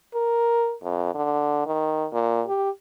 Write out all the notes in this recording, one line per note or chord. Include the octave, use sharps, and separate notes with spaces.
A#4
F2
D3
D#3
A#2
G4